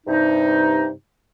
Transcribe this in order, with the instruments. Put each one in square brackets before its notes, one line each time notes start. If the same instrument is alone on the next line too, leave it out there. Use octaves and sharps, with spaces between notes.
[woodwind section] G2 C3 D#4